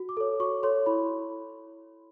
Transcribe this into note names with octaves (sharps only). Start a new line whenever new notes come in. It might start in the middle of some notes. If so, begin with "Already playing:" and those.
Already playing: F#4
D6
A4 C#5
F#4 C#6
A4 C#5 C6
E4 B5